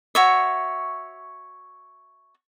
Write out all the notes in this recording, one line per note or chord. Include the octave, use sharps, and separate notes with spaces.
F#4 C#5 E5